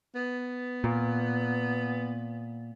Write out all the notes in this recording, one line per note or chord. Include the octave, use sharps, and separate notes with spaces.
B3
A#2